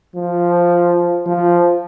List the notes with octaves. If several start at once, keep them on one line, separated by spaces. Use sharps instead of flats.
F3
F3